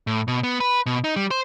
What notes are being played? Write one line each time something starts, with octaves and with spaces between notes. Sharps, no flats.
A2
B2
B3
B4
B2
D#4
G3
C5